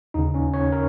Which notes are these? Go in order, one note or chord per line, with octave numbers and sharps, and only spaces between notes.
D#2 C#3 D#4
C#4
C#5
A#4